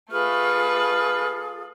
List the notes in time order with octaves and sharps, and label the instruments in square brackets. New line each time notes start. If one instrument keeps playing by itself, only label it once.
[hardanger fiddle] A3 B4 [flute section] F4 G#4 A4 [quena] F6